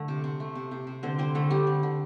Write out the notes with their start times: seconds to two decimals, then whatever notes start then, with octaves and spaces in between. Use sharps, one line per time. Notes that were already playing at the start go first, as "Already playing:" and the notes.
Already playing: D3 A3
0.08 C3
0.24 C3
0.40 A3
0.55 C3
0.71 C3
0.87 C3
1.03 D3 C4 C5
1.18 G3 C4 C5
1.35 D3 A3 A4
1.50 D3 G3 G4
1.67 D3
1.83 D3